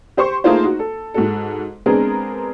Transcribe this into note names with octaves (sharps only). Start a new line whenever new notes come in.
G4 C5 C6 C#6
A3 A#3 D#4 F4 G#4 C5
D#4 F#4
A4
G#2 F#4 A4
G#3 B3 C4 D4 G#4 A#4